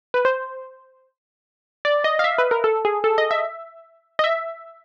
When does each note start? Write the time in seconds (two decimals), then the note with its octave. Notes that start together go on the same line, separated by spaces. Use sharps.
0.14 B4
0.25 C5
1.85 D5
2.04 D#5
2.19 F5
2.24 E5
2.38 B4
2.51 A#4
2.64 A4
2.85 G#4
3.04 A4
3.18 D#5
3.31 E5
4.19 D#5
4.24 E5